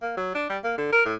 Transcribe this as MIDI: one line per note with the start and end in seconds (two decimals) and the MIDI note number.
0.02 0.15 58
0.17 0.31 54
0.35 0.49 62
0.50 0.58 55
0.64 0.73 58
0.78 0.92 50
0.93 1.03 70
1.06 1.15 45